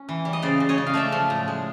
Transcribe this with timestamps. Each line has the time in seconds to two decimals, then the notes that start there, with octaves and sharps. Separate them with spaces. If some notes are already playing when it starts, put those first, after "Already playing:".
Already playing: C#4
0.09 E3
0.25 G3
0.33 D#5
0.42 C#3 C5 D5
0.60 C#3
0.69 C#5 D#5
0.78 C#3
0.87 F5
0.94 A3 D5 E5
1.12 F3
1.30 A2
1.48 G#3